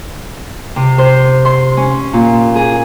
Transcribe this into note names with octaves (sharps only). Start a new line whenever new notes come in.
C3
C5
C6
C#4
A#2
G#4